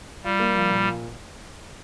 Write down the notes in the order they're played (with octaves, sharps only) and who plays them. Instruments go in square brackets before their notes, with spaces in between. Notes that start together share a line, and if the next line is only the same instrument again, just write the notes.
[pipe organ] G3 [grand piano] F4
[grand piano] A#3
F3
A#2